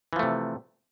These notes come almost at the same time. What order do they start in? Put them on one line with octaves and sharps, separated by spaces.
E3 F3 A3 C3